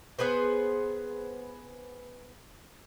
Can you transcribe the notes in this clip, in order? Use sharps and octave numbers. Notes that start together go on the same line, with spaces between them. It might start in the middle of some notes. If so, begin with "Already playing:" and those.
B3 G#4 B4 C5